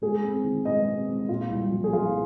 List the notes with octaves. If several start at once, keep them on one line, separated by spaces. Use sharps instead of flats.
G#3 G#4
C4
D#3
G#3 D#5
C4
G#3
A#2 F4
C2
F3
G#4
F3 F4